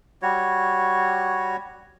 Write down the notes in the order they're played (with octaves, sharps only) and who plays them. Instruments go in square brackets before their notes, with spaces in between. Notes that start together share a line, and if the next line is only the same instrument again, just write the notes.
[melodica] G3 F#4 C#5